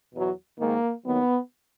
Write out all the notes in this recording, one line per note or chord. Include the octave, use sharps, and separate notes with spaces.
E2 B2 F#3
G#2 D#3 G#3 A#3
D#2 D#3 F#3 B3